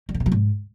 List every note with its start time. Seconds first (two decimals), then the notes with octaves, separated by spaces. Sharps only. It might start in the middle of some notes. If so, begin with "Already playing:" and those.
0.09 G3
0.14 D3
0.20 C3
0.26 F#3
0.32 G#2